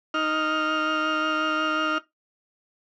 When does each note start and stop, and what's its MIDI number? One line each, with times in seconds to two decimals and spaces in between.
0.14 1.98 63
0.14 1.98 89